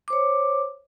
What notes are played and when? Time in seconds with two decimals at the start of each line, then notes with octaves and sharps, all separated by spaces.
0.08 D6
0.10 C5
0.13 C#5